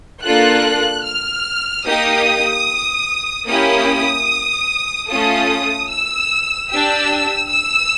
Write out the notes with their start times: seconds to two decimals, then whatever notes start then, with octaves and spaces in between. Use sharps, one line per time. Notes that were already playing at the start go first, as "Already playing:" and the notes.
0.23 A#3 D4 F4 A4 F#6
1.04 F6
1.85 A#3 D#4 G4 D#6
3.46 A#3 C#4 E4 G4 D#6
5.08 A3 C#4 F4 A4 D#6
5.89 E6
6.69 D4 G4 E6
7.50 E6